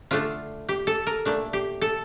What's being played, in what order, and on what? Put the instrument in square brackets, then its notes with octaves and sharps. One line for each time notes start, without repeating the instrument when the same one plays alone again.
[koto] D3 A3 D4 F4
G4
A4
A#4
A#2 A3 D4
G4
A4